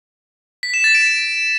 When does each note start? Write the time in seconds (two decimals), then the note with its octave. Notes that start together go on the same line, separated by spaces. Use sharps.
0.63 B6
0.74 E7
0.84 A6
0.95 D7